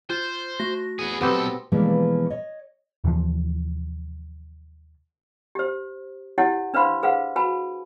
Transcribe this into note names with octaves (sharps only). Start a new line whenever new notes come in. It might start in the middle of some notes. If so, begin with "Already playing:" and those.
F4 C5
A3 F#4 A#6
B3 G#4
B1 B3 C4 G4 A4
B2 E3 F3 G3 G#3 A#3
C#5 D#5
D#2 C3 E3 F3
G4 C5
E4 G4 C#5 F#5 G#5
D4 B4 C5 F5 B5 C6
G#4 B4 C5 F5 F#5
F#4 B4 G#5 B5